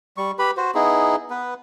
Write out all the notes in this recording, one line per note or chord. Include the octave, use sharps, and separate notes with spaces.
G3 C#6
G4 B4 B5
F#4 C5
B3 D#4 E4 G#4
B3 B4